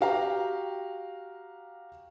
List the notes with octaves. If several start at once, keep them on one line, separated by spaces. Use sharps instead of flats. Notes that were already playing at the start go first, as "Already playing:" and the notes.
F#4 G4 F5 G5 A#5